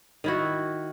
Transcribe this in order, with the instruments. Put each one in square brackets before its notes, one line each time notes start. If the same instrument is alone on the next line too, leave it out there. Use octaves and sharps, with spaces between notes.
[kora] D#3 E4 F#4